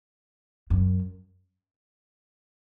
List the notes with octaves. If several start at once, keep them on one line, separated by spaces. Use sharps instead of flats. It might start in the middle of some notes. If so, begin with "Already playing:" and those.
F#2